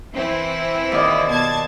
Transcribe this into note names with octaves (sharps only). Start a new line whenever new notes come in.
E3 C4 E4
D#2 D5 D#5
B2 A5 G#6